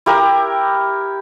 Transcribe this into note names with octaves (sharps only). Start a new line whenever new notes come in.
E4 G4 A#4